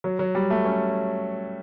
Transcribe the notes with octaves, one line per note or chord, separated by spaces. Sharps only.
F#3
F#3
G3
A3
C#4